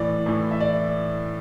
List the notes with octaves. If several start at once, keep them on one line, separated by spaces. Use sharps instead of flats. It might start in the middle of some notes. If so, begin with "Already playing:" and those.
Already playing: A2 E3 D5
A2 E3
E5
D5